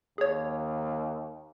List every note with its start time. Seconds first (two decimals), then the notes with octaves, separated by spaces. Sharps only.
0.18 D#2 G#4 C#5